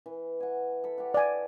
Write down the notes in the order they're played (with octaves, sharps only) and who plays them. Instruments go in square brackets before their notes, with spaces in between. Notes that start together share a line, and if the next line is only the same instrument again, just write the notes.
[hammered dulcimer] E3
F#5 G#5
A4 B5
G4 C#5 F#5
[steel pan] D5 G#5